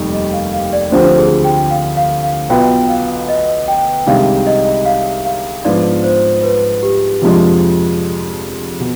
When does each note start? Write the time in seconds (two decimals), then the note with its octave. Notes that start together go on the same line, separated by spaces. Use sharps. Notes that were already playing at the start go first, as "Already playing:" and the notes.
Already playing: F1 D#2 D#3 G3
0.13 D#5
0.33 F5
0.53 F5
0.73 D5
0.92 D2 D3 F3 C4 G4 C5
1.18 G#4
1.44 G5
1.71 F5
1.97 F5
2.23 F5
2.50 B1 B2 B3 F4 B4 G5
2.89 F5
3.29 D#5
3.68 G5
4.07 C2 C3 D#3 G#3 D4 F5
4.47 D#5
4.85 F5
5.25 F5
5.65 G#2 F3 B3 D4 F4 D5
6.04 C5
6.43 B4
6.83 G4
7.22 F2 C3 F3 G#3 D4 F4
8.80 B2